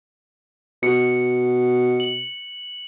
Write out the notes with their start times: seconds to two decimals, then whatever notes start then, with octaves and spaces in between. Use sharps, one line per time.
0.83 B2 C#7
2.00 F#7